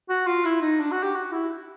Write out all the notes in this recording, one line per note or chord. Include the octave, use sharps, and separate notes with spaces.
F#4
F4
E4
D#4
D4
F#4
G4
F#4
E4